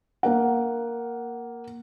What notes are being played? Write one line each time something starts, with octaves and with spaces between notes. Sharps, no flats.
A#3 A#4 F#5